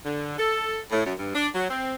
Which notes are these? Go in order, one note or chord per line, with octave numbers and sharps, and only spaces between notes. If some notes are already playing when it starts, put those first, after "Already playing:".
D3
A4
A2
F#2
G2
D4
F#3
C4